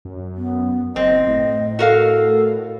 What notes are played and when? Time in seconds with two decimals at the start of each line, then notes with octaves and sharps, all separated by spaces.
0.05 F#2
0.37 B3
0.96 F#1 C4 D#5
1.27 A2
1.79 F#4 A4 A#4 F5